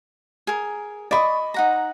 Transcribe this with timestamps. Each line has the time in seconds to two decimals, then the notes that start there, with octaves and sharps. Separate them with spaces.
0.47 G#4 A#4
1.11 D5 D#5 B5 C#6 D#6
1.54 D#4 F#5 A#5